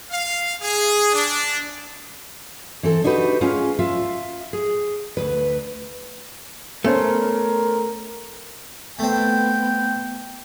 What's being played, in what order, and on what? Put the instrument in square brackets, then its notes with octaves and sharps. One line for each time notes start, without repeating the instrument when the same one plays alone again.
[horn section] F5
G#4
D4
[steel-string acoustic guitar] E3 C4 A4
D4 D#4 F#4 G4 B4
G#3 C#4 F4 G#4
F4 E5 F5
G#4
D2 B4
[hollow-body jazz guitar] A3 [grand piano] B3 C#4 C5 [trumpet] A#4
[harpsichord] A3 C4 [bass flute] B3 [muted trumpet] G5